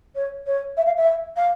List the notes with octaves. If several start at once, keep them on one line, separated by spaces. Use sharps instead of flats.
C#5
C#5
E5
F5
E5
F5